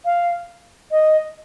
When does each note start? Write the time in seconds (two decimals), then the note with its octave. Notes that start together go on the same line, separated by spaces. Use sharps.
0.05 F5
0.91 D#5